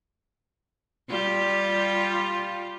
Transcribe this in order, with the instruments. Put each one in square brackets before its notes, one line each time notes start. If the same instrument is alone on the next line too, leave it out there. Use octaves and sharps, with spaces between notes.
[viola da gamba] G3 F4 G4